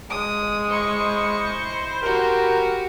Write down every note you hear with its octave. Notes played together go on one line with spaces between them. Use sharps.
G#3 D#6
E4 C5 D#5 C#6
F#4 G4 A#4